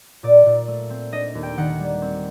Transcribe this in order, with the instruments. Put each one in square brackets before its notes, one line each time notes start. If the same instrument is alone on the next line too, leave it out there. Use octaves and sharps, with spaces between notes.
[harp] A#2 D5
A#2
A3
C4
D4 D#5
D#2
G5
D#3 F#5
G3
C4